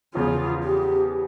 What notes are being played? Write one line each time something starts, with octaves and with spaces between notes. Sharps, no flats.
E2 C#3 F3 F4
G4